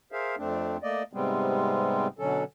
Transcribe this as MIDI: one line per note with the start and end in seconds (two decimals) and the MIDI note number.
0.12 0.36 68
0.12 0.36 70
0.12 0.36 72
0.12 0.36 76
0.12 0.36 77
0.38 0.77 41
0.38 0.77 57
0.38 0.77 60
0.38 0.77 62
0.82 1.03 57
0.82 1.03 58
0.82 1.03 74
0.82 1.03 75
1.13 2.07 44
1.13 2.07 48
1.13 2.07 55
1.13 2.07 56
1.13 2.07 59
1.13 2.07 60
2.19 2.44 47
2.19 2.44 50
2.19 2.44 54
2.19 2.44 61
2.19 2.44 69